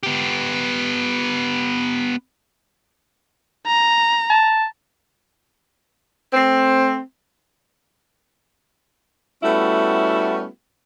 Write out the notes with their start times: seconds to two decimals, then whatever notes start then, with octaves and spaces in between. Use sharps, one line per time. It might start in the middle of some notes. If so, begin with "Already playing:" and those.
0.03 B3 G4
3.67 A#5
4.30 A5
6.33 A3 C4
9.43 G3 A3 B3 C#4 E4 F#4